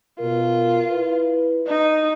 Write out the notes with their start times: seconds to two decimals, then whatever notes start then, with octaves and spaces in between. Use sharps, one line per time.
0.20 B2 F4 A#4
0.91 E4 B4
1.67 D#4